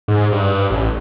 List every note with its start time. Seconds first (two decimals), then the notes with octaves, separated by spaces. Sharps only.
0.08 G#2
0.32 G2
0.70 A1